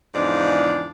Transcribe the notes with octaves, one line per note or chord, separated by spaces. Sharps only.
E2 G#2 C#3 F3 D4 D5